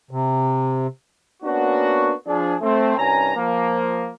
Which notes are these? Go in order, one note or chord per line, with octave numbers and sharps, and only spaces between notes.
C3
A#3 B3 C#4 D4 F#4
F3 D4 G#4
A3 C4
C2 G2 C#4 G#5 A#5
F3 A#3